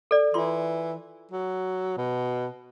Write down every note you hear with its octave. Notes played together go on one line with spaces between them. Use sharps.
A4 D5
E3 F4 C6
F#3
B2